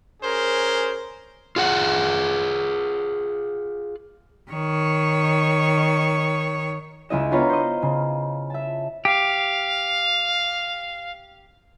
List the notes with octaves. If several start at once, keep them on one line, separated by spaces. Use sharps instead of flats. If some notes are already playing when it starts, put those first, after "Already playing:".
C#4 G#4 A#4 C5
F4 G#4 F#5
D#3 C#5
C#2 E4 D#5 E7
B3 D4 F4 B4 C#5 A#5
C5 D#5
C#3
E5 A5
G4 F5